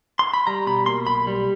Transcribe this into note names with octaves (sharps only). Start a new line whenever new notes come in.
C6
B5
G3 A#5
B2 B5
A#3 C6
B1 B5
G3